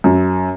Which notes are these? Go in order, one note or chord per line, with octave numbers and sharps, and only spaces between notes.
F#2